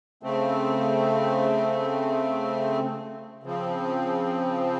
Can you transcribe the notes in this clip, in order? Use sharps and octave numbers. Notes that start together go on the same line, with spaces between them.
C#3 A3 C4
C#3 F3 C4